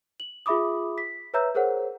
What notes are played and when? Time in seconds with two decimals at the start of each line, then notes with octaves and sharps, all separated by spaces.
0.20 F#7
0.46 F4 G#4 E5 B5 D6 D#6
0.98 B6
1.34 B4 C#5 E5 A#5 E6 G6
1.55 G#4 A#4 C5 C#5 F#5